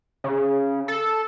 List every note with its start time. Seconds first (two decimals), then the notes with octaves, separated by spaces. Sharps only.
0.24 C#3
0.88 A4